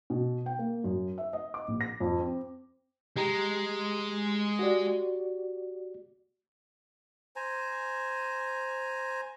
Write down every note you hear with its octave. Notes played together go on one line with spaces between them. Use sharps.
B2
G5
A#3
F#2
E5
D#5
D6
A#1
A#6
F2
C4
G#3 G4 A#5
F#4 G4 D5
C5 G#5 A#5